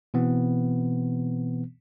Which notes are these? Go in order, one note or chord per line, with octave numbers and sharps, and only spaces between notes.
B2 E3 B3 C4